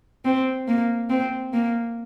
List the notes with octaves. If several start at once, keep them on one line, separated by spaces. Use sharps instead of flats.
C4
A#3
C4
A#3